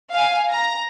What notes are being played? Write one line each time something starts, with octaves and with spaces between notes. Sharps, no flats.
F5 G#5
A#5